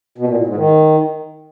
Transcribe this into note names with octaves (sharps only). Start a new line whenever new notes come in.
B2
A#2
A2
G#2
D#3